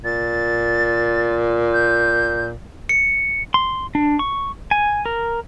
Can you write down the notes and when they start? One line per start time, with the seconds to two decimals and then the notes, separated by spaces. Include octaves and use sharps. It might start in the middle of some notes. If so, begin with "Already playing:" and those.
0.04 A#2 A6
1.73 G6
2.89 C#7
3.54 C6
3.95 D4
4.19 C#6
4.71 G#5
5.06 A#4